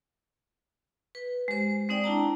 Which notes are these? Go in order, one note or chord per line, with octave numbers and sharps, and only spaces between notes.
B4
G#3 G4 C5
G#3 C4 D#4 D5 G5
D4 E4 A5 A#5